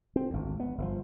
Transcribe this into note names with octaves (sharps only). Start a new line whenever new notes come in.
C4
G#1 D2
B3
G1 D3 F3